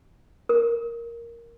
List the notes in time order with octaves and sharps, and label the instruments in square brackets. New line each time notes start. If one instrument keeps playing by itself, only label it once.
[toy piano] A#4